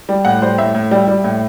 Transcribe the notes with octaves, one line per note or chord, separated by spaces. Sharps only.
G3
A2 F#5
G3 C5
A2 E5
A2
G3
G3
A2